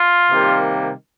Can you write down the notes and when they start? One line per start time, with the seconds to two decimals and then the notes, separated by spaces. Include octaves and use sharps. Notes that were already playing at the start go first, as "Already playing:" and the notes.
Already playing: F4
0.29 C3 D#3 G3 A#3